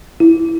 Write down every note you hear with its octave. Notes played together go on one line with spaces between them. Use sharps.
E4